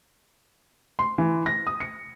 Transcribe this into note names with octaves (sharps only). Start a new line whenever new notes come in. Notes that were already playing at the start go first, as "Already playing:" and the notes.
C6
E3
A#6
D#6
C#7